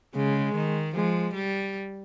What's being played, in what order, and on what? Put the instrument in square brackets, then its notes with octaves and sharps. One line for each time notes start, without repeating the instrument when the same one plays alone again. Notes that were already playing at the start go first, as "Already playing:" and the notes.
[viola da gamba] C#3 [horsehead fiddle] G#3
[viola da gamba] D#3
[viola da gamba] F3 [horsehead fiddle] G#3
[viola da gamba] G3